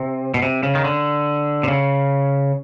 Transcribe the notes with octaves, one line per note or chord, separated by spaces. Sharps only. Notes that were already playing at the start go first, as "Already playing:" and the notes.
Already playing: C3
B2
C3
C#3
D#3
D3
C3
C#3